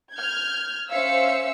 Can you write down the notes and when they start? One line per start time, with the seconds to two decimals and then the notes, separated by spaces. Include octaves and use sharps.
0.14 F6 G6 G#6
0.90 C#4 C5 E5 F5 E6 C#7